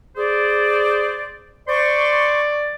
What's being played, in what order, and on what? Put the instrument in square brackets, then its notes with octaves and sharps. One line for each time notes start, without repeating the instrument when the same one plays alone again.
[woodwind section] G#4 C5 D5
[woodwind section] C5 C6 C#6 [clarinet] D5